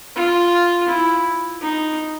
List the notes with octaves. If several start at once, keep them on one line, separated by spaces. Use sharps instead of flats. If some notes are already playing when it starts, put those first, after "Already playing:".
F4
E4
D#4